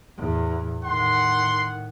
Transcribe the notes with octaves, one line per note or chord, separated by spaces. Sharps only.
E2 A2
A2 D#3 F#5 C6